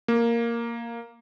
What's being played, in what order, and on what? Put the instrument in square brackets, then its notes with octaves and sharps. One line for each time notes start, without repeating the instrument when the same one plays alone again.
[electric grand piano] A#3